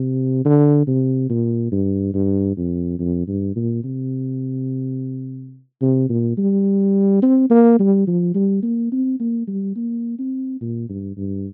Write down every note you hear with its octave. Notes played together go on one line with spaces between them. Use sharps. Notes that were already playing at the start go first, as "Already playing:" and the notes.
Already playing: C3
D3
C3
A#2
G2
G2
F2
F2
G2
A#2
C3
C3
A#2
G3
C4
A#3
G3
F3
G3
A#3
C4
A#3
G3
A#3
C4
A#2
G2
G2